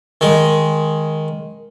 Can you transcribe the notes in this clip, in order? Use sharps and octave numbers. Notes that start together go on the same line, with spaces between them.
D#3 G#3